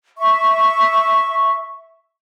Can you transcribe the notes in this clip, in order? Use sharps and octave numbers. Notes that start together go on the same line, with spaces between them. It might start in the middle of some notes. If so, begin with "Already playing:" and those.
E5 C#6